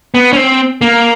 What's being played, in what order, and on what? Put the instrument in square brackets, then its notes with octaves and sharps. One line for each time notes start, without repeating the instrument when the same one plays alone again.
[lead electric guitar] B3
C#4
C4
A#3